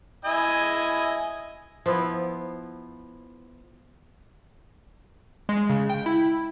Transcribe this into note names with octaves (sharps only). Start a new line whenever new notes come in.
E4 D#5 G#5
F3 B3 E4
G#3
C#3
G5
E4